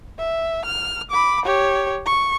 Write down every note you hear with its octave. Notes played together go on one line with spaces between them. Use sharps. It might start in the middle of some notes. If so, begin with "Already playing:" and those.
E5
F6
B5 D6
G4 C#5
C#6